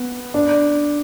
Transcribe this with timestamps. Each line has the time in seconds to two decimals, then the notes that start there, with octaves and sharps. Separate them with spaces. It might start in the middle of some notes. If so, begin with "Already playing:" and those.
Already playing: B3
0.34 D4